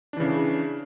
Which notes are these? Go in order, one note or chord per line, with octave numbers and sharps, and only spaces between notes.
C#3 E3 D4